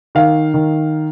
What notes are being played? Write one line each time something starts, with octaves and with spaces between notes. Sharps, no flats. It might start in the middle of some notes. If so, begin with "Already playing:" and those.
D#3 F5
D#3